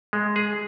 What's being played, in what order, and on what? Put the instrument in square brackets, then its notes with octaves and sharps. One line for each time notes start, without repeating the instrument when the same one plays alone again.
[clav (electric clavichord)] G#3
G#4